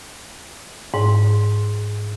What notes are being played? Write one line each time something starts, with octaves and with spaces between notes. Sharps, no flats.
G#2